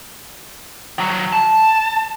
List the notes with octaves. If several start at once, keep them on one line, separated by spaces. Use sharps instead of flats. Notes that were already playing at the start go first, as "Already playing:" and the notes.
D#3 F#3
A5